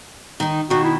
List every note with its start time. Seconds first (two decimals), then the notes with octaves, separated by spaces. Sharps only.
0.40 D#3 D#4
0.70 B2 D#3 F#4
0.84 E4